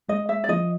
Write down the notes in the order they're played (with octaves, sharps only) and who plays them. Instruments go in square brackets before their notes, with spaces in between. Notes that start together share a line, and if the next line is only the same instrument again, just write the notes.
[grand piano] G#3 [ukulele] D#5
[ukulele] E5
D5
[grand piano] F3 [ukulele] D#5